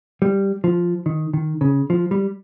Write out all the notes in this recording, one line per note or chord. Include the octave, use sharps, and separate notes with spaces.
G3
F3
D#3
D#3
C#3
F3
G3